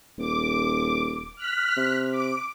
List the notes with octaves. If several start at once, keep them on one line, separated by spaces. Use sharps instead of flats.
D#1 D6
F6 F#6 B6
C3
D6